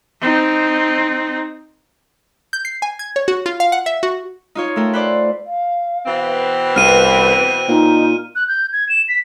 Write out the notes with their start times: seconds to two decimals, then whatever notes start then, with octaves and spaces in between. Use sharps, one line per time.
0.21 C4 D#4
2.53 G6
2.65 C7
2.82 G#5
2.99 G#6
3.16 C#5
3.28 F#4
3.46 F4
3.60 F5
3.72 F#5
3.86 E5
4.03 F#4
4.55 D#4 F4 C#5
4.76 A3 A4 A#4 G5
4.93 B4 C5 D5
5.46 F5
6.06 B2 E3 C4
6.76 C2 B4 F6 D#7
7.68 A#2 D#4
8.36 F#6
8.48 G6
8.73 G#6
8.89 E7
9.09 B6